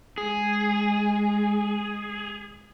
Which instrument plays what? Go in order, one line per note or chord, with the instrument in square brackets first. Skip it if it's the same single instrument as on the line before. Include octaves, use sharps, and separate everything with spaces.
[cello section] G#3 [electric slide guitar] G#4